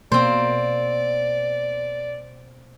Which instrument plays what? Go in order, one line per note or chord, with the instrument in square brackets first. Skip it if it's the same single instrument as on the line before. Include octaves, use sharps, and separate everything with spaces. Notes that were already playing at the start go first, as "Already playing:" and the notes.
[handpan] B2 A#3 [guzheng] C4 C5 [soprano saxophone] D5